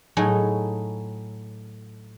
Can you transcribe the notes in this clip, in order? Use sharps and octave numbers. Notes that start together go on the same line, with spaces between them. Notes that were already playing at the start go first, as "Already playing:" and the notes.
A2 F#3 D#4 G#4 D#5